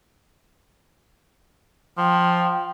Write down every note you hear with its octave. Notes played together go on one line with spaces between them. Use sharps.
F3 G5